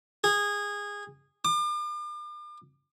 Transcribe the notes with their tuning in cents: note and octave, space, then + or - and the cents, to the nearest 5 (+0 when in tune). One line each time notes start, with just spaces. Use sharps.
G#4 -20
D6 +40